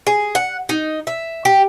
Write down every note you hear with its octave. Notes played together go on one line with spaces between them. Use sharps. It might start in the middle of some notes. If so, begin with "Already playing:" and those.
G#4
F#5
D#4
E5
G4